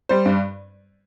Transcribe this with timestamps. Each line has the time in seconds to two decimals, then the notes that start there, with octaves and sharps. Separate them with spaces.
0.09 G3 C5
0.25 G2